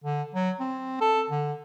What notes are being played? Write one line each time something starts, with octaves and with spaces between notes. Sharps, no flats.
D3
F#3
C4
A4
D3